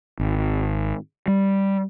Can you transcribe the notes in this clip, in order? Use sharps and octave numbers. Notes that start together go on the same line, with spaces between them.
G#1
G3